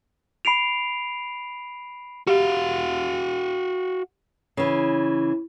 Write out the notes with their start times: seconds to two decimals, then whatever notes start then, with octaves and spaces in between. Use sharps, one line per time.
0.45 B5 C7 D7 F7
2.27 F#4 G4 F5
4.57 C#3 E3